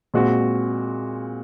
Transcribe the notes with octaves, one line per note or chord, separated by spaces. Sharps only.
A#2 G#3 C4 F#4